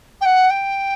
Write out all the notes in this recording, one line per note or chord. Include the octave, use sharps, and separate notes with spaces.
G5
F#5
G5